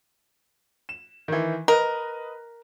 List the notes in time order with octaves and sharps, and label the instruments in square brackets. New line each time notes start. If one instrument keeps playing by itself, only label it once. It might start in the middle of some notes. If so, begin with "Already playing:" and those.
[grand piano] E7
D#3 E3
[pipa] A#4 [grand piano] B4 D#5